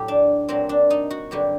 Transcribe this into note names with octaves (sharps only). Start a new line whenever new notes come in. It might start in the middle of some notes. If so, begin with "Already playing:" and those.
Already playing: A2 F#3 G4 A4
D4
A#2 F#3 C4
D4
D#4
F#4
G2 D3 F#3 G4